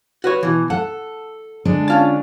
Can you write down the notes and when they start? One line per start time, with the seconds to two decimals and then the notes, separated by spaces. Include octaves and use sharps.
0.24 F#4 B4 C#5
0.43 B2 E3
0.70 A4 F#5
1.65 D3 G#3 D4
1.88 C#4 F4 A5